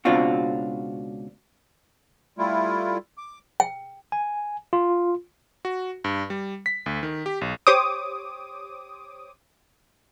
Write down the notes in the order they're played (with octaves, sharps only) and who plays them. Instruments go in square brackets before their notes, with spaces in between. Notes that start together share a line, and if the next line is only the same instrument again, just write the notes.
[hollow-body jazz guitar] C#2 B2 C4 D4 F4 F#4
[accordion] G3 A3 E4 F4
D6
[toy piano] G5
[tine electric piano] G#5
F4
[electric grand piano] F#4
G2
G3
B6
D2
D#3
G4
B1
[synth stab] G4 C5 C#5 D6 D#6